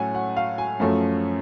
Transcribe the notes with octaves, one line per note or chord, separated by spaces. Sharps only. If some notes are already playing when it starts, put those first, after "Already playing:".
Already playing: A2 F#3 A3 C#4 F#5 G#5
F#5
F5
G#5
F#2 F3 A3 C#4